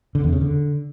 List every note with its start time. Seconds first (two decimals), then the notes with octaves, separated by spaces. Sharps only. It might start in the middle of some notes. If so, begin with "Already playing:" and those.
0.15 D3
0.24 E2
0.33 C#3
0.41 D3